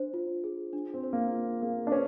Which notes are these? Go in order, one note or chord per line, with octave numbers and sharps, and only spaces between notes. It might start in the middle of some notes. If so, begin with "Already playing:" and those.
Already playing: D4 C5
F4
G#4
D4
C4
C5
A#3
F4
A#3 G#4
D4
C#4 B4